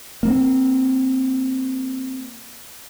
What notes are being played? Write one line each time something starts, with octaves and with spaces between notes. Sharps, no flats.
A#3 C4